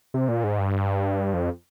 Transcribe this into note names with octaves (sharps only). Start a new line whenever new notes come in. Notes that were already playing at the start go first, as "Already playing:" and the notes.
C3
A#2
G#2
G2
F2